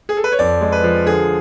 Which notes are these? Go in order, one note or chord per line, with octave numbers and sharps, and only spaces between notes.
G#4
A4
B4
C#5
F2 D5
G#3
B4
F3
D3 G#4